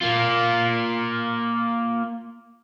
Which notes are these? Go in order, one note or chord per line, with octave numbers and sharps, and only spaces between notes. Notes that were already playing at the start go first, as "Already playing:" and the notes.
A#3 F4